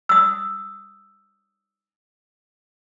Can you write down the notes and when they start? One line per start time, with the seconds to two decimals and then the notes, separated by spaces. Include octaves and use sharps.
0.09 D#6 E6